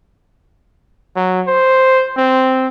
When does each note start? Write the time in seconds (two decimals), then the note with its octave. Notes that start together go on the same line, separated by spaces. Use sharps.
1.16 F#3
1.48 C5
2.17 C4